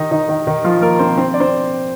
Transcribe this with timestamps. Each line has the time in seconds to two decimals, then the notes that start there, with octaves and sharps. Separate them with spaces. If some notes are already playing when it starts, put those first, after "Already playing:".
Already playing: D#3 D#4
0.11 D#3 D#4
0.29 D#3 D#4
0.47 D#3 D#4
0.64 F3 F4
0.81 A#3 A#4
0.99 C4 C5
1.17 C4 C5
1.34 D5
1.40 C4 C5